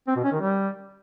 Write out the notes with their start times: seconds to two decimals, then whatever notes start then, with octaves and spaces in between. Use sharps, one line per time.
0.07 C4
0.16 B2
0.24 C#4
0.32 D#3
0.40 G3